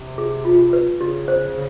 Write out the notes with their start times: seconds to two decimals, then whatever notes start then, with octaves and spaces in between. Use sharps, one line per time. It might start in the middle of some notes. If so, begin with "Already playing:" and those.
Already playing: C3
0.18 G#4
0.45 F4
0.73 B4
1.00 C#3 G4
1.28 C5